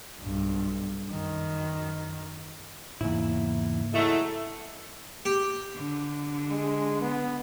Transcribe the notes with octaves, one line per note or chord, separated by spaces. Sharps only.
B1 G2
F#2 D#3
E2 G#2 C#3 A#3 E4
F#3 G#3 A3 E4
G4
D3
G#3
B3